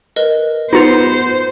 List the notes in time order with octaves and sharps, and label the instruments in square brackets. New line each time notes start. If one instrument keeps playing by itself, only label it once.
[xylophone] A#4 B4 D#5
[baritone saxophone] B3 [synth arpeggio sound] D#4 F4 [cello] C5 [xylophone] A#6 C#7 F7